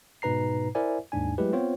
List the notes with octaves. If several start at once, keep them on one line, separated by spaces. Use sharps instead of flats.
G#2 B2 D#4 B4 A#5 C7
E4 A#4 C5 D5 E5 G#5
D#2 G#2 D4 G#5
F#3 G#3 A3 E4 G4 B4
B3 C4 F4 C5 C#5